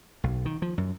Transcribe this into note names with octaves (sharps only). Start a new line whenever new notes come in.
B1
D#3
F3
F#2